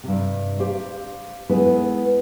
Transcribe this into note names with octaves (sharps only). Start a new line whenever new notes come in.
G2 C3
G4 C5 F5
G#3 B3 E4 A4 B4